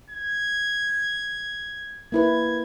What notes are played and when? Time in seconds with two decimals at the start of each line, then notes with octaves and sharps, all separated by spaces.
0.10 G#6
2.12 A#3 E4 B4 G#6